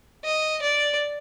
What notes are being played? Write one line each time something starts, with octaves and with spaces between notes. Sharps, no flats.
D#5
D5